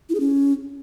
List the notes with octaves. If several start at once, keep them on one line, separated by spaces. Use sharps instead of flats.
E4
G#4
C#4